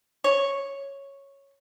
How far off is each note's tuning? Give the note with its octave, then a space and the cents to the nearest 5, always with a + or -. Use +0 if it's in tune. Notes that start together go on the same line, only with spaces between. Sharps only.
C#5 -5